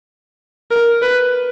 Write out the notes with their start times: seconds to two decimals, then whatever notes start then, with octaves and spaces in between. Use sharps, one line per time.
0.71 A#4
1.02 B4